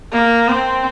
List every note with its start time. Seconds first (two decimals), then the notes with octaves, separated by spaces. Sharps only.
0.12 A#3
0.48 C4